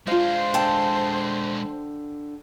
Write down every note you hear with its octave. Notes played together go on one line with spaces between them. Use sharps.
G#3 D4 F4 C5 F5
D3 G5 A5